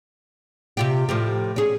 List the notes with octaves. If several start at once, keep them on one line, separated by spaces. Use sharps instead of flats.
C3 F4 G4
A2 F3 G4
C#4 G#4